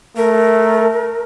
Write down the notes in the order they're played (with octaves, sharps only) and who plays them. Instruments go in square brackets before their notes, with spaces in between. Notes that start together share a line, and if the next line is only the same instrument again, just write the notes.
[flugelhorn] A3 [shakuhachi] A#4